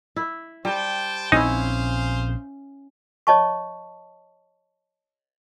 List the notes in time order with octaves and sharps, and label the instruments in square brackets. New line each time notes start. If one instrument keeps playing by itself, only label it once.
[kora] E4
[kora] G3 [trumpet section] C5 G5 A5
[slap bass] A#1 C4 [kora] C#4 E4 [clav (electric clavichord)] D#4 [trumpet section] G#4 C5 F5
[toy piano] C#5 D#5 A5 C#6